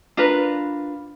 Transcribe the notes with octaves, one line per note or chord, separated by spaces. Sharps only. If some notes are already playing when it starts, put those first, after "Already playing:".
D4 F4 A#4 B4